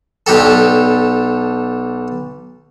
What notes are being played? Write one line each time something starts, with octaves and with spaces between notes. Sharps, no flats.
B1 D4 G4 A4